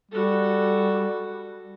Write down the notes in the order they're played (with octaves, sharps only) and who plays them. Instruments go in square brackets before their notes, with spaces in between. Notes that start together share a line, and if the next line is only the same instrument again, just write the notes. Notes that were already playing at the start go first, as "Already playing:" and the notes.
[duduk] G3 [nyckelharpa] F#4 A4